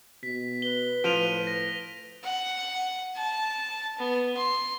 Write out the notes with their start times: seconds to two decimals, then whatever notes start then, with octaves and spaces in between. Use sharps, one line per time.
0.23 B2 B6
0.62 B4 G7
1.04 A2 F3 D7 D#7 F7
1.47 A#6
2.24 F#5
3.16 A5
3.98 B3
4.37 C6